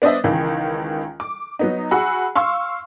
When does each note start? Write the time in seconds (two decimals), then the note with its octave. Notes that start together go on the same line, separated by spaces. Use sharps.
0.02 B3 D4 C5 D#5 E5
0.24 C#2 D#3 E3
1.20 D6
1.59 F#3 B3 D#4
1.91 F#4 G#4 F#5 B5 E6
2.35 F5 C6 C#6 E6